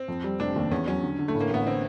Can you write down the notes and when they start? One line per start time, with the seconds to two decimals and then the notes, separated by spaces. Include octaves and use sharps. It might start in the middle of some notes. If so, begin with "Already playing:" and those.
Already playing: C4
0.08 F2
0.24 G3
0.40 F1 D4
0.56 D#2
0.71 E2 C#4
0.87 F#3 C#4
1.03 D3
1.19 D3
1.28 A3
1.35 A2
1.41 A#3
1.51 A1 B3
1.67 D3 C4